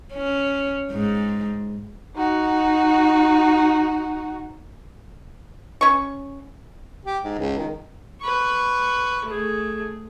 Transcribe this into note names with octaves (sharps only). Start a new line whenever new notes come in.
C#4
G#2
D#4 F#4
C#4 C#6
G4
G#2
C#2
D#3
B4 C#6
A3 G#4